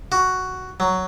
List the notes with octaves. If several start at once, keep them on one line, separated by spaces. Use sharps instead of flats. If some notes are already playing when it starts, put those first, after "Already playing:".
F#4
F#3